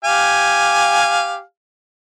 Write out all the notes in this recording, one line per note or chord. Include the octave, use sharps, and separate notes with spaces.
G4 F5 G#5